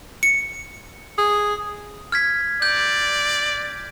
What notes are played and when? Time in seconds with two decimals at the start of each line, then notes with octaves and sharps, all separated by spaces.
0.23 C#7
1.18 G#4
2.12 F6 G#6 B6
2.62 D5 G6